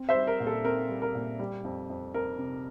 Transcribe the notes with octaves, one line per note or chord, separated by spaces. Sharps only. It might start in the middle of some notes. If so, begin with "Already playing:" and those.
Already playing: C4
C5 E5
G3
A#4
A#2
A4
C4 A#4
G3
A#4
A#2
G3
F2
F2
F2 A#4
C3